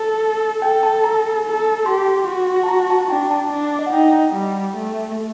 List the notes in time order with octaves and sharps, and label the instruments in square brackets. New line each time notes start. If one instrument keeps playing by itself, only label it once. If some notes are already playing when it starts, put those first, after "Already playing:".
Already playing: [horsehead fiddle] A4 [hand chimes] A5
[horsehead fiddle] A4 [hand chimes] G5
[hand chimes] A5
A#5
[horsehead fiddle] A4
[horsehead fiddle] G4 [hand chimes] C6
[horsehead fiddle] F#4
[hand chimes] A5
A#5
A5
[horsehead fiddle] D4 [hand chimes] G5
[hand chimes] A5
[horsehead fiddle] D4
[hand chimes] D#5
F#5
[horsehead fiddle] D#4 [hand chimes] G5
[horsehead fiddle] G3
A3